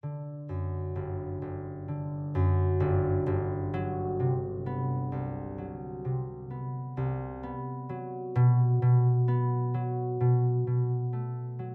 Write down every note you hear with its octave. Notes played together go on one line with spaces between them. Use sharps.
D3
F#2
G1
G1
D3
F#2
G1
G1
F#3
C3
B3
C2
F#3
C3
B3
C2
B3
F#3
B2
B2
B3
F#3
B2
B2
A3
F#3